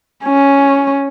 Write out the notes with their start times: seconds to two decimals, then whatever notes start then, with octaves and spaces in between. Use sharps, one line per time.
0.25 C#4